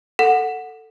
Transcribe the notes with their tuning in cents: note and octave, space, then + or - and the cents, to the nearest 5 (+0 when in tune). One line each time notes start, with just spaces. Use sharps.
A4 +15 F#5 -5